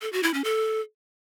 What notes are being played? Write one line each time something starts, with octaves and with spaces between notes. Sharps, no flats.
A4
F#4
E4
C#4
A4